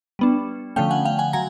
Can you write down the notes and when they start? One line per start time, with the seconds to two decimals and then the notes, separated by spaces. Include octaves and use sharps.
0.19 G3 B3 D4
0.76 D3 F3 A3 C#4 F5 G5
0.91 F#5 G#5
1.05 F5 G5
1.19 F#5 G#5
1.33 F#3 G#5 A#5